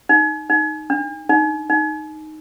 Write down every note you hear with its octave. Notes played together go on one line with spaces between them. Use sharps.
D#4
D#4
D4
D#4
D#4